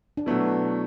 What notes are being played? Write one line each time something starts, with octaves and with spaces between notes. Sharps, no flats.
D4
B2 F#3 A3 B3 E4